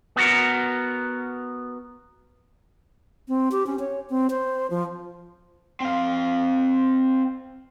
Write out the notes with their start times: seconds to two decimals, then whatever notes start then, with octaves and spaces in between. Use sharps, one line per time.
0.16 B3 F#4 A#4
3.28 C4
3.52 G4
3.66 C#4
3.79 C#5
4.10 C4
4.30 C5
4.71 F3
5.80 C4 F5